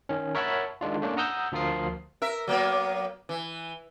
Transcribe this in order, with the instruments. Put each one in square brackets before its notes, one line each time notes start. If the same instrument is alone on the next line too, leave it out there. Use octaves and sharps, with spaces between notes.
[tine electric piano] D#3 C#4
A#4 C#5 E5 F#5 A5 B5
D#3 G#3 D4 F4
A3 A#3 C#4 D4
F#5 A#5 D#6 E6 G6
D2 F3 F4 A#4 D#6 C7
[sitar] A#4 E5
F#3 A#3 B3
E3